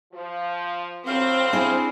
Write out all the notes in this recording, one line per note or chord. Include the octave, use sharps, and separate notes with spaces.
F3
A2 D3 F#3 C4 F5
D4 E4 G#4